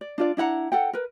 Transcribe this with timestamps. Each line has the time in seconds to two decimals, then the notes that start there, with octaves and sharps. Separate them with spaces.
0.01 D5
0.18 D4 F4 D5
0.37 D4 E4 F#5 A#5
0.72 A4 F#5 G5
0.93 A#4 B4